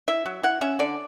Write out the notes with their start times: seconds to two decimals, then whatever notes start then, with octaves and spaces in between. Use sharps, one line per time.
0.08 E4 E5
0.26 F#3
0.43 E4 F#5
0.61 C#4 E5
0.79 D3 D5